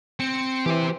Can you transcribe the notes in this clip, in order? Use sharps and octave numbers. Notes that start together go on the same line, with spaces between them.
C4 C#7
E3 G4 C5